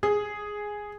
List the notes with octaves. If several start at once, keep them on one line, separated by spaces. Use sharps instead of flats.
G#4